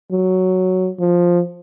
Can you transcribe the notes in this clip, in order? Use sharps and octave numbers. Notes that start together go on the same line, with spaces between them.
F#3
F3